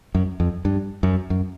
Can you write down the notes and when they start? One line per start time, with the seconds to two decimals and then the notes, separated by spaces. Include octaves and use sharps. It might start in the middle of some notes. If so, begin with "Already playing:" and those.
0.15 F#2
0.40 F2
0.65 G2
1.03 F#2
1.30 F#2